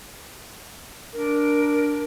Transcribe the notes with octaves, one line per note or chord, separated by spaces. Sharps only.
D4 A#4